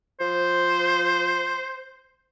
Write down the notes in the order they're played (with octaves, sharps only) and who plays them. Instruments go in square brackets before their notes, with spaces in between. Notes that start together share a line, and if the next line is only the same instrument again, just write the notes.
[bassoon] F3 [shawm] C5